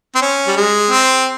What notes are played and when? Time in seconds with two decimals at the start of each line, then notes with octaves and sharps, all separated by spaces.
0.15 C4
0.21 C#4
0.47 G3
0.57 G#3
0.91 C4